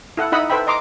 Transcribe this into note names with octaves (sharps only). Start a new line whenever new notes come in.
E4 A4 F#5
D#4 E4 D#5 F#5 B5 E6
A4 B4 C5 E5 G5 B5
D#5 A#5 C6 D6